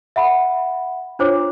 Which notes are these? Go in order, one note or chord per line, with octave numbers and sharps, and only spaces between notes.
E5 F#5 B5
D4 F4 C5 C#5 D6